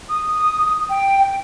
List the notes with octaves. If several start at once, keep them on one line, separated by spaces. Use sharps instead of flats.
D#6
G5